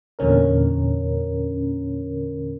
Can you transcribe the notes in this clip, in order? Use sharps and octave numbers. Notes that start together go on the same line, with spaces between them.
E2 A#2 D3 C#4 A#4